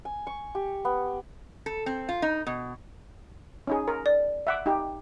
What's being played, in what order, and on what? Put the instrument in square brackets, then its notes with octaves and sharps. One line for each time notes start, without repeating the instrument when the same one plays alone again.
[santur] G#5
C#6
G4
B3
[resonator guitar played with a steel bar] A4
C4
F4
D#4
B2
[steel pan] C#4 D#4 G#4
A#4
[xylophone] D5
[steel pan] E5 F#5 D6
D#4 G4